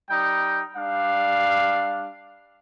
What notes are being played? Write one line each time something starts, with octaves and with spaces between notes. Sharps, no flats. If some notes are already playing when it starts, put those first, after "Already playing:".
G3 D#4 G5
G3 D4 F5